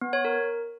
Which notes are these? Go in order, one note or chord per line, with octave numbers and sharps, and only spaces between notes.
B3
C#5
A#4